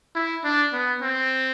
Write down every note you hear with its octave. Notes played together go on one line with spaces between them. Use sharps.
E4
D4
B3
C4